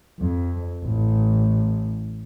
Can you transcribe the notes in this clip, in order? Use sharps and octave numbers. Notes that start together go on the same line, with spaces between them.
F2
A1